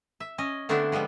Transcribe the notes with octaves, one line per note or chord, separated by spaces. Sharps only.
E5
C#4 D#5
D3 A3 B3 C4 D4 E4
F3 G3 G#3 B3